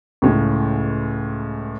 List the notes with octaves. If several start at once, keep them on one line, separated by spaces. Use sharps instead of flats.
C#2 A2 C#3